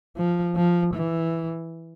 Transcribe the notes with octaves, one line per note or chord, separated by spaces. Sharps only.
F3
F3
E3